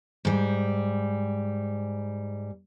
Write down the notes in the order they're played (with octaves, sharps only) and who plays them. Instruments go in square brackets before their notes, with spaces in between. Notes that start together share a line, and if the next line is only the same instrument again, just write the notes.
[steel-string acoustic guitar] G#2 G3